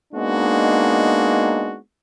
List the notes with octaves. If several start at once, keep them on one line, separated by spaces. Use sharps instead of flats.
G#3 A#3 B3 D4 D#4 F#4